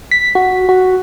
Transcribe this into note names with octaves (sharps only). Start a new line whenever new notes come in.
B6
F#4
F#4